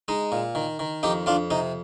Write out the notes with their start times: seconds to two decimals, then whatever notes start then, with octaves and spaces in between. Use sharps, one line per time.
0.08 G#3 D#4
0.32 A#2
0.55 D#3
0.79 D#3
1.03 F2 D#4 G4
1.26 F2 D4 F4
1.51 C3 D#4